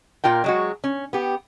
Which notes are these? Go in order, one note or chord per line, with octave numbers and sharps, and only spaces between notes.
A#2 F4 A#4 G5
F#3 G#3 F#4
C#4
B3 G4